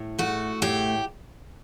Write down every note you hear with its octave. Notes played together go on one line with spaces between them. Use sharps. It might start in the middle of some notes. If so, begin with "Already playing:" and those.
Already playing: A2
A3 F#4
A2 G4